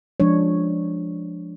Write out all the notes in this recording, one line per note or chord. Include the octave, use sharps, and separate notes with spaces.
F3 G#3 D4 C#5